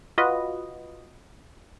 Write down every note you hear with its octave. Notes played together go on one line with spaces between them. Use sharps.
F4 F#4 B4 D#5